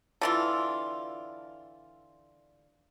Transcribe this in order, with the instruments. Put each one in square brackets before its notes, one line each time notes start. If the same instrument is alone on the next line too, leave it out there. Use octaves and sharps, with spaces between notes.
[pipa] D3 E3 F4